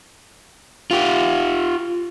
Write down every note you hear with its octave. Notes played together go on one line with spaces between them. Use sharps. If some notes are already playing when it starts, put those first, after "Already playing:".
F4 G4